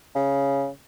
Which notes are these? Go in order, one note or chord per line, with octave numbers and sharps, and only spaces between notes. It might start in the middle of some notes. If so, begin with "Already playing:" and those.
C#3